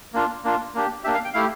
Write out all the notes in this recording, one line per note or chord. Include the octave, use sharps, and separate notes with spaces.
A#3 D4 F4
A#3 D4 F4
A#3 D4 G4
A#3 D4 G4 E5
F5
G5
A3 E4 G4 F5